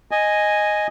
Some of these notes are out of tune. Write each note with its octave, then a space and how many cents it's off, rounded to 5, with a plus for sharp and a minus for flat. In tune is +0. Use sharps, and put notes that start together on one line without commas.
D#5 -5 G#5 +0